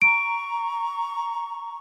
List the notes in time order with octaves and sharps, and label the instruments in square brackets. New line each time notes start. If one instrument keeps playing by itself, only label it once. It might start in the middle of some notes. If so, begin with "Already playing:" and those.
[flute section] A#5 C#6 [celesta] D7